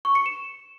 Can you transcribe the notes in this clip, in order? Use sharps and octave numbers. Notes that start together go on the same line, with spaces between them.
C#6
C#7
E7